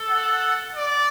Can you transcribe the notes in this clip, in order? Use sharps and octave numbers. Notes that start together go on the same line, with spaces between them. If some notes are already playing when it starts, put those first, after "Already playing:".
Already playing: A4
F#5
D5